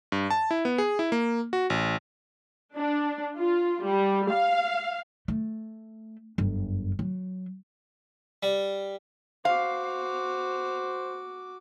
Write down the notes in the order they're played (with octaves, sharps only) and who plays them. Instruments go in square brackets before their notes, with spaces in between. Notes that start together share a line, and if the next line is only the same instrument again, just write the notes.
[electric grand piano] G2
A5
E4
B3
G#4
E4
A#3
F#4
A1
[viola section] D4
F4
G3
F5
[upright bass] A3
G1 F#2
F#3
[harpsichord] G3
[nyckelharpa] F#4 D6 [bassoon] C5 [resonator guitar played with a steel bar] F5